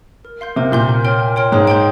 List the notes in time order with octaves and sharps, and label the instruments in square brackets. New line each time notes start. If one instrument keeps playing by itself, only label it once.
[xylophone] A#4
F5 C6 G6
[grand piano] C3 [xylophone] A#4
[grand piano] A#2 [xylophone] F5 C6 G6
[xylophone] A#4
C#5 G5 C6 F6
A#4
C#5 G5 C6 F6
[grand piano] G#2 [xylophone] C#5
[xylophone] G5 C6 G6